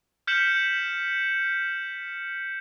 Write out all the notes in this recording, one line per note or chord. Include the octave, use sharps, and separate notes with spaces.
F6 G6 B6 C#7 E7 F#7